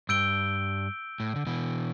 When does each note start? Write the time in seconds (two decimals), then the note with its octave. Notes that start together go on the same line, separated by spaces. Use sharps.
0.09 G2 E6 G6 D7 G7
1.20 A2
1.36 D3
1.46 B2 E3